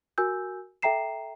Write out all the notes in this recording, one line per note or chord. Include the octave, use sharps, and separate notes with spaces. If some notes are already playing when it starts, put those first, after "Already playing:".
F#4 A#4 G#5 E6 G6
A4 E5 G5 A#5 C7 E7